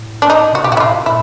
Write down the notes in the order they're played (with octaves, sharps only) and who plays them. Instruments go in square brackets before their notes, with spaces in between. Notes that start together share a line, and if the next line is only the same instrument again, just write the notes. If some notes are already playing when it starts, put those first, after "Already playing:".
Already playing: [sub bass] A2
[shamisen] D4
D#4
[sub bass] C3 [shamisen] F#4
[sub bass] B2 [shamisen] G4
[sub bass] A#2 [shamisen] F#4
[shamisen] E4
[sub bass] A2 [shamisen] F4
[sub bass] A#2 [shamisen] E4